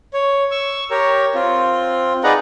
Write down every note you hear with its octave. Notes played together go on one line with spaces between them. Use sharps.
C#5
C#6 E6
G4 A#4 C#5
C4 F4
D#4 G#4 B4 D5 F#5 A#5